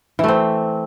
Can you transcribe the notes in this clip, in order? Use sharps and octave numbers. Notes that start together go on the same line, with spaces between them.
E3 A3 C4